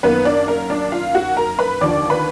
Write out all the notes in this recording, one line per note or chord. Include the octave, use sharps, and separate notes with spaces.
F#2 D#3 A#3 B3 B4
D4 D5
A#4
D4 D5
F4 F5
F#4 F#5
A#4 A#5
B4 B5
D#2 D3 F3 D5 D6
B4 B5